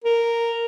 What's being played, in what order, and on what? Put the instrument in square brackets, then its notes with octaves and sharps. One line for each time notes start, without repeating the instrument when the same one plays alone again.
[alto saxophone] A#4